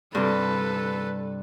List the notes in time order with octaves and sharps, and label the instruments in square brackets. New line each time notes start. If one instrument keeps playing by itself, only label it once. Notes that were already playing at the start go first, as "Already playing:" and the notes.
[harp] G2 C3 [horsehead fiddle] A4 B4